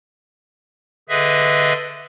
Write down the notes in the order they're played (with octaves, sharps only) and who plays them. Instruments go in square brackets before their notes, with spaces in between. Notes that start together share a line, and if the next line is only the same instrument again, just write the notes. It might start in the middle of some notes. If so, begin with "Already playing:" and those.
[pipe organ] D3 G#4 B4 D#5 E5